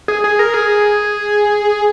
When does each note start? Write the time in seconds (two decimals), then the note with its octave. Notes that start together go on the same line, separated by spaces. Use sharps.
0.08 G#4
0.24 G#4
0.39 A#4
0.54 G#4